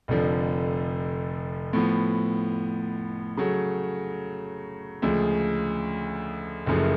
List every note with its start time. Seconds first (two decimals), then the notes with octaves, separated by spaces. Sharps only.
0.08 F1 F2 D3 F3
1.73 A2 F3 B3
3.37 C#3 F#3 A3
5.02 D2 C#3 F3 G#3
6.66 F#1 F#2 C#3 F3 A3